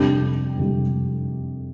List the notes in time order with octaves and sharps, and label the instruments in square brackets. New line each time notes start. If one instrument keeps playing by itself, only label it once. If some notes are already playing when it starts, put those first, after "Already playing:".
Already playing: [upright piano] F2 C3 G3 D4 G4
F2 C3 G3